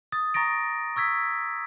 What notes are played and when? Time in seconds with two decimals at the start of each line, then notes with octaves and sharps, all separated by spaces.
0.12 D#6 A6
0.34 A#5 C#6 A6 A#6 D7
0.96 C#6 E6 G#6 B6